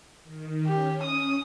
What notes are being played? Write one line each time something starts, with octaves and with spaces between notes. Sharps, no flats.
D#3
C#4 G4
D#6